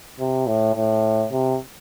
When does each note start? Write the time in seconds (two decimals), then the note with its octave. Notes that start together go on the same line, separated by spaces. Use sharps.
0.19 C3
0.47 A2
0.76 A2
1.32 C3